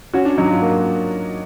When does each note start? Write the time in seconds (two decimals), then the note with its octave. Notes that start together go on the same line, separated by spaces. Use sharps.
0.13 C#4 F#4
0.25 D4
0.38 F#3 D#4
0.50 F4
0.62 A#3